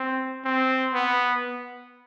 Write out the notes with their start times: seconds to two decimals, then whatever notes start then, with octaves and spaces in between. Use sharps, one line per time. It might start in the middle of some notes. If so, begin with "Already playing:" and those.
Already playing: C4
0.45 C4
0.94 B3